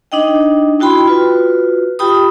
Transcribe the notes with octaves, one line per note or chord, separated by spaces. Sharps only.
D4 D#4 D#5 G5
D#4 E4 F#4 G5 B5 C6
F4 F#4 B4
F4 G4 G5 B5 D#6